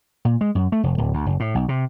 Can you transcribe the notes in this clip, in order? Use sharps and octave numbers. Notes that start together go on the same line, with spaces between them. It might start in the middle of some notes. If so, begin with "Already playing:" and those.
A#2
G#3
F#2
A3
F1
D1
D2
F#1
A2
B1
C3